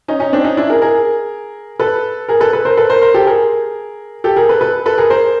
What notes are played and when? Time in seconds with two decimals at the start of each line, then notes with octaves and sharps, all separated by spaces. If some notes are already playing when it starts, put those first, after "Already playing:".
0.08 C#4 D#4
0.20 C#4 D#4
0.33 C4 D4
0.44 C#4 D#4
0.57 D4 E4
0.69 G#4 A#4
0.82 G#4 A#4
1.80 A4 B4
2.28 G#4 A#4
2.40 A4 B4
2.53 A4 B4
2.65 A#4 C5
2.77 A4 B4
2.90 A#4 C5
3.02 A#4 C5
3.14 G4 A4
3.26 G#4 A#4
4.24 G4 A4
4.36 G#4 A#4
4.49 A4 B4
4.61 A4 B4
4.86 A4 B4
4.98 G#4 A#4
5.10 A#4 C5